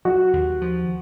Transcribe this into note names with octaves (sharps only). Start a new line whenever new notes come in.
F#3 F#4
D#2
F3